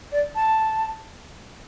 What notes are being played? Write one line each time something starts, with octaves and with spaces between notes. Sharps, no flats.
D5
A5